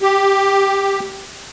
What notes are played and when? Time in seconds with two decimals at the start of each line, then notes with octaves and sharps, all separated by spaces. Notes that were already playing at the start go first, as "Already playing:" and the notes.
0.02 G4